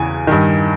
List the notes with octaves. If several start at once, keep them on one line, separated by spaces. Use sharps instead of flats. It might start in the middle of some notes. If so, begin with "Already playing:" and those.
Already playing: E2 C#3 E3 G#5
G2 D#3